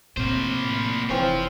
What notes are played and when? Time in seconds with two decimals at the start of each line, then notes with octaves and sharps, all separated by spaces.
0.17 A2 C3 A#3 C5
1.09 F1 E3 C4 C#4 C5 F5